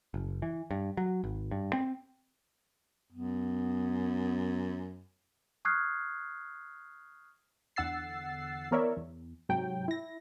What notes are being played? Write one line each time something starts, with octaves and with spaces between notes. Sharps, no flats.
F#1
E3
G2
F#3
G#1
G2
C4
F#2 B3
C#6 D#6 F6 F#6 G#6 C7
E2 D3 F#5 E6 A6 C7
E3 B3 A#4 C#5 D5 E5
E2
G#2 C3 F#3 G5
E4 A#6